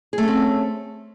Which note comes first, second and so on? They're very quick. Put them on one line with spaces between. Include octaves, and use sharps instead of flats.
G#4 A3 C#4 C4